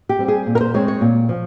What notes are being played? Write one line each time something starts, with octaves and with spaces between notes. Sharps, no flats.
G4
G3 C4
G#4
A#2
A#4
C5
G#3 C4 C#5
C#5
A#2
F3